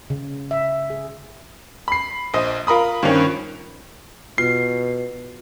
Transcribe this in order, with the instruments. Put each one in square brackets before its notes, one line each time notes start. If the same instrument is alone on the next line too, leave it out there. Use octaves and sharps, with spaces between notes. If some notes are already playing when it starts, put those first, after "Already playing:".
[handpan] C#3
E5
G#4
[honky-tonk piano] B5 C7
A#1 C5 D#5
F4 A#4 B5 D#6
G2 D#3 F3 C#4
[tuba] B2 [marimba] F4 [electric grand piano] C7